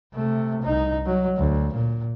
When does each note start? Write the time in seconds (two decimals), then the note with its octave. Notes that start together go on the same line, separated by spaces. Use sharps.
0.14 C3 A3
0.63 C2 D#4
1.06 F#3
1.37 D2
1.73 A#2